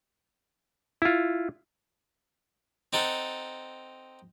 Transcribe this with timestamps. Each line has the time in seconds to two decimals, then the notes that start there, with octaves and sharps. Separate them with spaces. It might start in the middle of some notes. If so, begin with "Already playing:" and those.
1.02 E4 F4
2.93 C4 D#4 A4 F#5